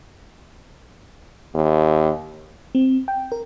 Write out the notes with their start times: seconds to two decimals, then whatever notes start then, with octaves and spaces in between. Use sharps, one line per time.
1.55 D#2
2.75 C4
3.08 G5
3.32 A#4